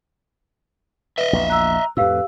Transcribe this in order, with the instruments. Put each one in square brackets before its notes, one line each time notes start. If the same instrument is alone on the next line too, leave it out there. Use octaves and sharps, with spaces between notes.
[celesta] B4 [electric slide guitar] D#5 E5
[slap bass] A#1 E2
[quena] A#5 [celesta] E6 F#6
[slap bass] F2 A2 [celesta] G4 F5 E6 [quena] B4